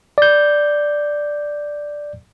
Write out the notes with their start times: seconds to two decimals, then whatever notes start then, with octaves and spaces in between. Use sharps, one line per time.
0.18 D5 G6